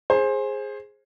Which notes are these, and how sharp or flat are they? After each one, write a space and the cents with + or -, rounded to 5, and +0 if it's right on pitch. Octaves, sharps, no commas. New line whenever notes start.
G#4 +0 C5 +20